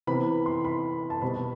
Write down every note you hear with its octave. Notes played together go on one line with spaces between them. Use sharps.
C3 E3 B3 B5
C6
B5
A5
B2 G3 B3 B5